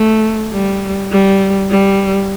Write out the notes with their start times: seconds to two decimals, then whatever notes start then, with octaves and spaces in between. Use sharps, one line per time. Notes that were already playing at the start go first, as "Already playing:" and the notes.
Already playing: A3
0.53 G3
1.11 G3
1.70 G3